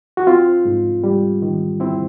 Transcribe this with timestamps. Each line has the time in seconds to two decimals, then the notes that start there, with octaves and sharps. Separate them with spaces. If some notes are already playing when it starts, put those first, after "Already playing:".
0.17 F#4
0.27 C4 F4
0.65 G#2
1.04 G3
1.42 D#3
1.80 C4 E4